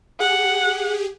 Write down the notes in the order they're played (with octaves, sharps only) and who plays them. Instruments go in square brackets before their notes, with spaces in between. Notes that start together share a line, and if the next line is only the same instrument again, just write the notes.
[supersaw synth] G4 G#4 [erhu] F#5